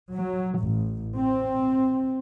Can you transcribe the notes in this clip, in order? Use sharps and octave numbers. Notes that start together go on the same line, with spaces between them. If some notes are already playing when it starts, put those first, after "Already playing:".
F#3
A1
C4